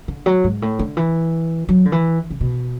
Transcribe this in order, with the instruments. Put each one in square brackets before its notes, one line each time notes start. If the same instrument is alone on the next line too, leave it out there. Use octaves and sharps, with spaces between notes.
[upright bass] D3
F#3
G#2
A2
D3
E3
F#3
D3
E3
C#3
B2